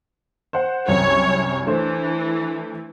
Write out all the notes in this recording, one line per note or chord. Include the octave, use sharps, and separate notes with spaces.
C5 F#5
C2 F#2 C#5
E3 A3 D4 C5